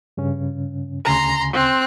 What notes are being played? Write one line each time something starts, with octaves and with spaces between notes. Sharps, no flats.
G2 C#3 C#4
D2 C#3 G#5 A#5 C6
C4 F#6